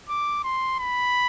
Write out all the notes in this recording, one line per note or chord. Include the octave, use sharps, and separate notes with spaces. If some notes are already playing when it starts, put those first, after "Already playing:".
D6
C6
B5